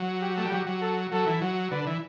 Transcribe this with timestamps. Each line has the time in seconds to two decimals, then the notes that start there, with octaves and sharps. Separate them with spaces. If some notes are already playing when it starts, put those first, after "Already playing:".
Already playing: F#3
0.21 G4
0.37 A3
0.45 G3
0.52 F#3 G4
0.67 F#3
0.81 A4
1.12 F#3 A4
1.26 E3
1.41 F#3
1.71 D3 B4
1.87 E3